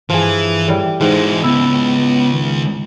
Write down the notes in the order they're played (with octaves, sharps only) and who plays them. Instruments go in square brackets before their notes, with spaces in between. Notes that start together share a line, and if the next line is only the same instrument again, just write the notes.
[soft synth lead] G2 [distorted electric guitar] E3 [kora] F3 G#4
[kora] A2 G3
[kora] G#2 [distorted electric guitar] E3 G#3 [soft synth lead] C5
[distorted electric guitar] C#2 [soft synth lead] B3 [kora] E4
[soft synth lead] D#3